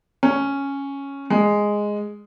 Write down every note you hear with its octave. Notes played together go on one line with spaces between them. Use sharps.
C#4
G#3